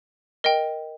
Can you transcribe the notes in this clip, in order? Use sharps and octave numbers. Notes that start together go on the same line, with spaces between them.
A#4 D#5 G5